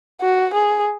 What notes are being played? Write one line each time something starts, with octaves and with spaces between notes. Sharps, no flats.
F#4
G#4